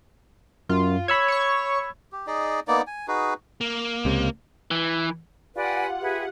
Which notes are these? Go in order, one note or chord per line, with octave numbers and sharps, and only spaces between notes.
F#2 F4
C#5 B5 E6 G#6
C#5 C#6
G4
D#4 G#4 D5 D#5
A#3 B3 D#4 D5
G#5
D#4 F#4 G#4 B4
A#3
C#2 C3
E3
F4 G4 B4 D5 F#5 G#5
G#4 B4 E5